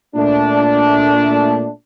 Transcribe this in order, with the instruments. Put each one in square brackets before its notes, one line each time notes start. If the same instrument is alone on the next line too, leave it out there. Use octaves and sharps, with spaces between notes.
[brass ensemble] A#2 A3 D4